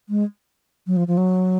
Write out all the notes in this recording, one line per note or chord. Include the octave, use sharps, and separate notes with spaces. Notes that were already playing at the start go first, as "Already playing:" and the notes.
G#3
F#3
F3
F3
F#3